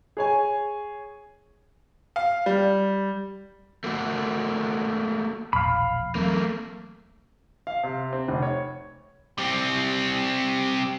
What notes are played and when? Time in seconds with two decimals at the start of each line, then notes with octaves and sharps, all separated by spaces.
0.17 G#4 C#5 G#5
2.16 F5
2.46 G3
3.84 A3 A#3 F#4
5.53 E1 A#1 F5 B5
6.15 E3 F#3 A3 A#3 C4
7.67 F5
7.84 C3
8.13 C4
8.28 F1
8.42 C#5
9.38 G3 C4